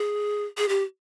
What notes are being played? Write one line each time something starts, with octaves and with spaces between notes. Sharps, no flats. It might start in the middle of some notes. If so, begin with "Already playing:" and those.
Already playing: G#4
G#4
G4